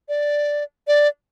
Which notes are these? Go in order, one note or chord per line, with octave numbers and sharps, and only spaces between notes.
D5
D5